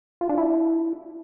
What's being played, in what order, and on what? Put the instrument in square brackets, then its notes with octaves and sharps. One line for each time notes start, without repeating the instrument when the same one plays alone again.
[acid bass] F4
D4
E4